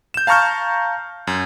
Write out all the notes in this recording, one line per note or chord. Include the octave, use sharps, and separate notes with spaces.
G6 E7
F5 A5 A#5 C#6 F6 G6
F#2